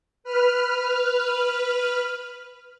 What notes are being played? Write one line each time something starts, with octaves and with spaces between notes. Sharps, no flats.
B4 F6